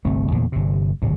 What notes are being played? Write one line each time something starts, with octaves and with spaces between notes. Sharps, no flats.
G1 C2 A3 C4
F1 E2 A#2 D3
G1 C3
D1 G#1 C3